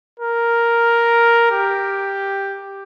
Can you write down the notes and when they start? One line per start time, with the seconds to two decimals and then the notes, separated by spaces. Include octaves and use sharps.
0.20 A#4
1.51 G4